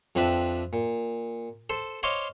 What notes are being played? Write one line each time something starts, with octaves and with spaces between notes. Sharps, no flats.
F2 F3 C4 D4 B4 E5
A#2
A4 C5
C5 C#5 D#5 F5 C6 D6